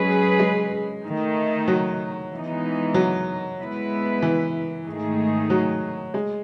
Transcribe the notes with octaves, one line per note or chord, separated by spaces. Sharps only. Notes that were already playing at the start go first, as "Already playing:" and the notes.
Already playing: F#3 G#3 C#4 G#4 B4
G#3
D#3 A3 D#4
F#3
E3 G#3 B3 D#4
F#3
G#3 B3 E4 B4
E3
G#2 D#3 A3 D#4 G#4
F#3
G#3